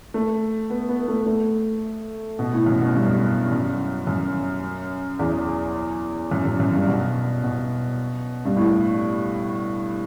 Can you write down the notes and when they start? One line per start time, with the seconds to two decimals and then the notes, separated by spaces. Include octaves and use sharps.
0.14 A3
0.70 B3
0.89 B3
1.08 A3
1.26 A3
2.39 B2
2.53 A2
2.67 F#2
2.81 B2
2.95 G2
3.51 F#2
4.07 F#2
5.19 E2
6.32 F#2
6.45 F#2
6.60 F#2
6.74 G2
6.88 B2
7.44 B2
8.45 G2
8.56 A2